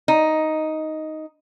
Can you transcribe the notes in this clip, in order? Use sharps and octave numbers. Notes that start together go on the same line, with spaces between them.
D#4